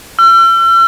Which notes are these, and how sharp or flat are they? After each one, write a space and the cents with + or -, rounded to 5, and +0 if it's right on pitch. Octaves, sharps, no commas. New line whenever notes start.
E6 +45